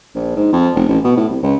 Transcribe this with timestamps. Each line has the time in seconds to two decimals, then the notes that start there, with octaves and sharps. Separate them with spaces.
0.15 A#1
0.36 G#2
0.53 F2
0.75 F1
0.89 A1
1.04 B2
1.17 A2
1.30 C2
1.43 C#2